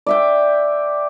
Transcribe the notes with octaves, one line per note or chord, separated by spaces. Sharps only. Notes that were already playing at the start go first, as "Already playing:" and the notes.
D5 E5 G5